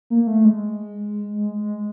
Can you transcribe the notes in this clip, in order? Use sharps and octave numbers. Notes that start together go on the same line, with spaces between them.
A#3
A3
G#3